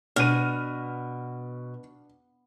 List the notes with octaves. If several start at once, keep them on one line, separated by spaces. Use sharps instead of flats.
B2 D4 F6 D#7